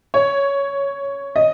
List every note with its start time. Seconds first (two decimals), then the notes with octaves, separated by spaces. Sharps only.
0.14 C#5
1.36 D#5